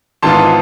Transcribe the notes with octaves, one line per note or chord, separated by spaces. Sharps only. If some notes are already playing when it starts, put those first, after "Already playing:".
G#1 G#2 E3 B3 F4 A5 C6